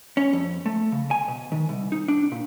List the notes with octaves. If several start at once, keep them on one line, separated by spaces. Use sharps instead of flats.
C#4
F2
A3
C#3
G#5
B2
D#3
C2
D#4
D4
A#2